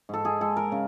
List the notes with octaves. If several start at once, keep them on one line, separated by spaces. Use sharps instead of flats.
G#2 A4
G#4
G#3 A4
A#4
C#3